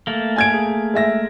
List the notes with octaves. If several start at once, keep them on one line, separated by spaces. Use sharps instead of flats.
A3 A#3
G#5 G#6 D7
G#4
G#3 E5 A#6